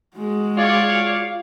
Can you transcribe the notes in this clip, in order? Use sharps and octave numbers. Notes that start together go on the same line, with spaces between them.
G#3 F#4
F4 C#5 D5 F5